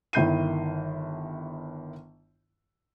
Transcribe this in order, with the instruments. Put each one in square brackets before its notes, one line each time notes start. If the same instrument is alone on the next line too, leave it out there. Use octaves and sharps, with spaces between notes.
[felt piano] G1 D#3 E4 G6 C7 D#7